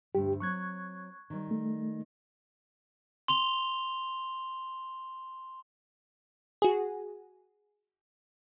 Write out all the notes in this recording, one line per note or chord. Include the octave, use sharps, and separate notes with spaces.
D2 G2 G4
F#3 C4 C#6 F#6 G#6
D#3 G3
A3
C6 F7 G7
F#4 G#4